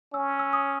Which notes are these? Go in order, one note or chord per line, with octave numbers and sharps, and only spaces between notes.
C#4 E6
E6
D#6